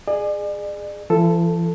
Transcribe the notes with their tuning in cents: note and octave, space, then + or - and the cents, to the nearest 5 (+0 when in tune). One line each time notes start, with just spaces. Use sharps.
G#4 +0 D5 +40
E3 +45 A4 +0